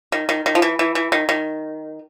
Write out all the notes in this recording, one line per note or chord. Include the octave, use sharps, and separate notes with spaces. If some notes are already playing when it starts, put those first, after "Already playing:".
D#3
D#3
D#3
F3
E3
E3
E3
D#3
D#3